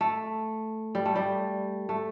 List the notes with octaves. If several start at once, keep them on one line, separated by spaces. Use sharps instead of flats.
A3
G3
A3
G3
A3